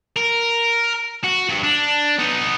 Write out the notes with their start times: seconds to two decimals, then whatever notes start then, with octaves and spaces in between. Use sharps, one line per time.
0.16 A#4
1.24 F#4
1.49 G2
1.63 D4
2.19 B3 D#4